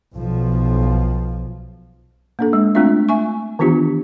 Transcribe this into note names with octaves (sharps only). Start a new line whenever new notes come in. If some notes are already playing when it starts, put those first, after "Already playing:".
B1 F3
A#3 D4 A4
G#3
A3 C4 D4 F4 E5
E5 G#5 C#6
D#3 E3 B3 D4 F4 G4